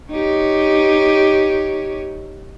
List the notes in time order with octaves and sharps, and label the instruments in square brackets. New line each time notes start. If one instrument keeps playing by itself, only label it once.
[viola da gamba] D#4 G4 C#5